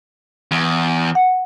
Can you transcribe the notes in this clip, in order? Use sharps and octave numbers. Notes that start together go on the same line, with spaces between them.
E2
F#5